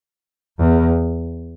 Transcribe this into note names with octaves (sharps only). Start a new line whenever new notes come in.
E2